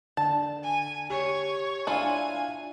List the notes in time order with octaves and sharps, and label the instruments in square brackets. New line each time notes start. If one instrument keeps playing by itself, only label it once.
[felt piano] D3 [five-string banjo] A5
[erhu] G#5
[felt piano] G4 [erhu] C#5
[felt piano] D4 F5 [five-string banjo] E4 F4 [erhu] G#5